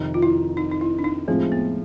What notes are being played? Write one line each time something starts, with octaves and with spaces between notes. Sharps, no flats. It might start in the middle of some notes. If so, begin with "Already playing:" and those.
Already playing: F2 C3 D#3
F4
E4
D#4
D#4
E4
D4
D#4
A2 F3 G#3 C4
B3